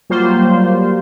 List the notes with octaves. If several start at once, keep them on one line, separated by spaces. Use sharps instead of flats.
F#3 G3 A#3 F4 C5